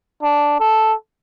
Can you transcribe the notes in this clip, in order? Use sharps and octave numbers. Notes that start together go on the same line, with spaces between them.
D4
A4